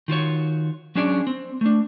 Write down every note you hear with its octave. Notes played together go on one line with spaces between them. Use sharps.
D#3 F4 F#4 C#5
F#3 C#4 D4 G#4 C#5 D5
C4
A3 D4